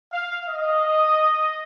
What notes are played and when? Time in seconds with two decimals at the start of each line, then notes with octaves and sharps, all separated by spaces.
0.12 F5
0.47 D#5